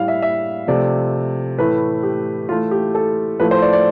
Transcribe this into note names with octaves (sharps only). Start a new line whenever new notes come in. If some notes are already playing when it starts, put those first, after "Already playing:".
Already playing: A2 G3 F5
E5
E5
C3 F3 A3 D5
A2 E3 A3 B4
G4
A2 E3 A3 F4
G4
A4
A2 F3 A3 B4
C5
D5
D5